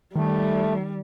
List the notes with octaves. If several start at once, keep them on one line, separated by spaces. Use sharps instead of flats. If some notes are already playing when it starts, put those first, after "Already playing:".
D#3 G3 A3